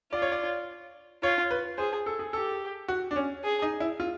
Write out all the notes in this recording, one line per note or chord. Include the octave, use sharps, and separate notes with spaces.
F4 D5
C#5
D5
F4 C#5
B4
G#4 C5
A4
G#4
G4 A4
F#4
D4
C#4
G#4
D#4
E4
F4